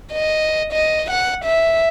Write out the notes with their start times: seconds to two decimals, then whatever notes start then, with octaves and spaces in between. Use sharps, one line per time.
0.12 D#5
0.72 D#5
1.10 F#5
1.44 E5